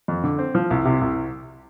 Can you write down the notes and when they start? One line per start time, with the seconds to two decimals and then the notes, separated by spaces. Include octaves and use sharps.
0.08 F2
0.24 D3
0.38 C4
0.55 F3
0.70 C2
0.85 C3
1.01 C2